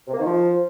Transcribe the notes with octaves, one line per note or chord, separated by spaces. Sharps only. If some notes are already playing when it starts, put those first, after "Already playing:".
C3
A#3
D#3
F3